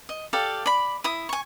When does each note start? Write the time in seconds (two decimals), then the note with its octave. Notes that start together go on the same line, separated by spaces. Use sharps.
0.09 D#5
0.33 G4 A4 D5 F5
0.66 D5 B5
1.04 E4 D#6
1.29 G#5 C#6